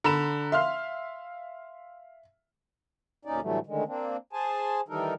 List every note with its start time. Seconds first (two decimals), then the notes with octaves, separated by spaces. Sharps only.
0.04 D3 A#5 B5 E7
0.52 E5 F5 C6 F6
3.25 D2 A#2 C#4 D#4 D5
3.41 A2 D3 E3 F#3 G3 A3
3.67 A2 D3 D#3 G#3
3.87 A#3 C4 D4
4.33 G#4 C5 G#5 A5
4.89 D#3 E3 G3 D#4 A4 A#4